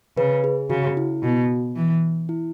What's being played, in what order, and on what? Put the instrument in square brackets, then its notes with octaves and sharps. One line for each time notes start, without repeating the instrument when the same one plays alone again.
[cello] C#3 [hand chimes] B4
[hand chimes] G#4
[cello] C#3 [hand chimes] F#4
[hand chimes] E4
[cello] B2 [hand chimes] F#4
[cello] E3
[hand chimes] E4